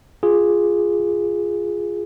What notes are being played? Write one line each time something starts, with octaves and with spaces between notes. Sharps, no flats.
F4 G#4